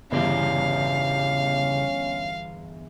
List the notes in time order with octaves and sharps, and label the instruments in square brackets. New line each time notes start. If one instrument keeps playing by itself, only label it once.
[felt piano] G1 E2 [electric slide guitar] C#3 E4 G4 [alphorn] C#4 [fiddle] F5